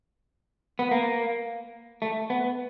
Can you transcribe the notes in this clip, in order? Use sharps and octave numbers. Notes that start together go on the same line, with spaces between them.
B3
A#3
A3
B3